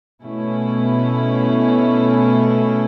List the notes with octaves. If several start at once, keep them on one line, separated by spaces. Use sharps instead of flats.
B2 A3 C#4 E4